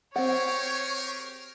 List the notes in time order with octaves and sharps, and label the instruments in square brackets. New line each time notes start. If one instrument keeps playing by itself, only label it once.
[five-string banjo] C4 F#5 [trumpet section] G4 G#4 A#4 [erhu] C#5